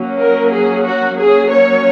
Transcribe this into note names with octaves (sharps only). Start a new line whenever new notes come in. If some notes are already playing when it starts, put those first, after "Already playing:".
Already playing: F#3 A#3 C#4
A#4
G#4
F#4
F#3 A#3 C#4 G#4
C#5